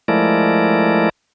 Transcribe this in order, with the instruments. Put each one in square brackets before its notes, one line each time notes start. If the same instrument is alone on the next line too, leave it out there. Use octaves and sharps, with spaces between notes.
[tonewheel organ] F3 G#3 A3 E4 A#4 D5